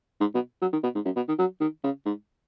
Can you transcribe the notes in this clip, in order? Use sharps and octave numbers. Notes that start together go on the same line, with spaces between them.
G#2
B2
F#3
D#3
B2
G#2
F#2
B2
D#3
F#3
D#3
C#3
G#2